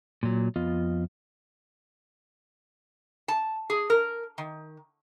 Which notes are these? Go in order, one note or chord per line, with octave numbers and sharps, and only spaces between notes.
A#2 F#3
F2 B3 F4 D#5
A5
G#4
A#4
D#3